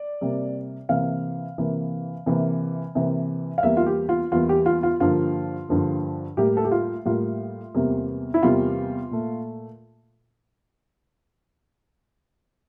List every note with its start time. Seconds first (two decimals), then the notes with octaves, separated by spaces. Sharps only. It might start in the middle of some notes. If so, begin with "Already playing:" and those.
Already playing: D5
0.21 C3 G3 A#3
0.89 C3 E3 A#3 F5
1.58 C3 E3 A#3
2.26 C3 E3 A#3
2.95 C3 E3 A#3
3.58 F5
3.63 E2 E3 G3 A#3 E5
3.77 F4
3.87 G4
4.09 F4
4.32 E2 E3 G3 A#3 F4
4.49 G4
4.66 F4
4.83 F4
5.00 G2 D3 F3 A#3 F4
5.69 G2 D3 F3 A#3
6.37 A2 G3 A#3 G4
6.57 A4
6.65 G4
6.72 F4
7.05 A2 G3 A#3 F4
7.75 E2 C3 G3 A#3
8.34 E4
8.43 E2 C3 G3 A#3 F4
9.11 A#2 A3